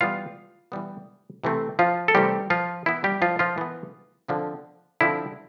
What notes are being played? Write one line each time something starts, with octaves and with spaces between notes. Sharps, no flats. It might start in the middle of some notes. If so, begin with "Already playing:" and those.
E3 G3 B3 F4 F5
E3 G3 B3
C3 E3 A3 C4
F3 F4
A4
C3 E3 G3 A3 C4 G4
F3 F4
E3 B3 E4
G3 G4
F3 F4
F3 F4
E3 B3
D3 F3 C4
D3 F3 C4 E4